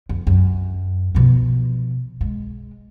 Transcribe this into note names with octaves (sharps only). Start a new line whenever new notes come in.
F2
F#2
B2 F3
G#3